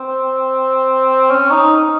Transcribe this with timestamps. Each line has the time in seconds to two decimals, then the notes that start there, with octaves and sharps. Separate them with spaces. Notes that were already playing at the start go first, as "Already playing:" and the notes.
Already playing: C4
1.30 C#4
1.51 D#4